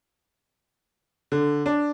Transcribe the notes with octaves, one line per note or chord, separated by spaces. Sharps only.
D3
D4